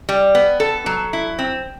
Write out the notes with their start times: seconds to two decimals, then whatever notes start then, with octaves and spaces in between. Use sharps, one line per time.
0.09 G3
0.35 B3
0.60 A4
0.86 F#3
1.13 E4
1.39 C4